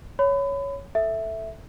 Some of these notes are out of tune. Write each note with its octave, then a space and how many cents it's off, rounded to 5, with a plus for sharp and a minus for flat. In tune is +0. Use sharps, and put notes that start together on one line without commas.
C#5 +5 B5 +30
A4 +0 E5 +0